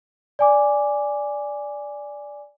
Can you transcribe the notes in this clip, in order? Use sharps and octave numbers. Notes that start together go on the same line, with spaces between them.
D5 G#5 D6